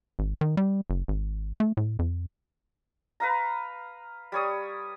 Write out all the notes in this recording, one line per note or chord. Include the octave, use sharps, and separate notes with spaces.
G#1
D#3
G3
F#1
G#1
A3
A2
F2
B4 F5 A#5
G3 C#5 D#6